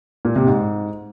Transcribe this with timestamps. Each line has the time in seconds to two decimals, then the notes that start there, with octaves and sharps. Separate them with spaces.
0.25 A#2
0.36 C3
0.47 G#2